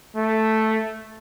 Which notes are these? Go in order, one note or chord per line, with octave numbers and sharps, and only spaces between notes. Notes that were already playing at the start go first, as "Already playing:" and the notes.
A3